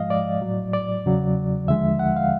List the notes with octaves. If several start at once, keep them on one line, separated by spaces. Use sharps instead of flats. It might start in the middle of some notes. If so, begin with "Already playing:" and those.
Already playing: G#2 F3 G#3 D#5 F5
D5
A2 F#3
D5
E2 C#3 F#3
D#2 D3 F3 G#3 E5
F#5
F5